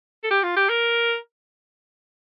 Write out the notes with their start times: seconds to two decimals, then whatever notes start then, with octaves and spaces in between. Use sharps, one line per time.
0.24 A4
0.31 G4
0.43 F4
0.57 G4
0.69 A#4